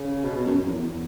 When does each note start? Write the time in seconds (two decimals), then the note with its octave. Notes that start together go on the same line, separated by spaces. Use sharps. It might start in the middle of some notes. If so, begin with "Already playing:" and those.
Already playing: C#3
0.24 B2
0.35 B2
0.46 F#2
0.57 F#2
0.65 E2
0.81 E2